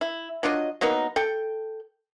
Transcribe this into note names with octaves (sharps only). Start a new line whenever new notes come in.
E4
F#3 D4 F4 D#5
F#3 A#3 B3 D#4
A4 G5